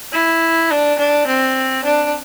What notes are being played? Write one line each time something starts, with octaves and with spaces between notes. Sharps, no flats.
E4
D4
D4
C4
D4